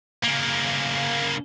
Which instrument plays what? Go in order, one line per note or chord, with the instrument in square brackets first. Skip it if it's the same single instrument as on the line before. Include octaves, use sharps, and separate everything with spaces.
[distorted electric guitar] C#3 A#3